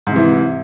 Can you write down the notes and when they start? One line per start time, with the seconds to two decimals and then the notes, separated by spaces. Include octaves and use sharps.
0.07 G#2
0.11 C3
0.16 E3